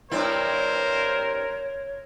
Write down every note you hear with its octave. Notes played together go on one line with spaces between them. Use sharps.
G2 C4 E4 A#4 C5 C#5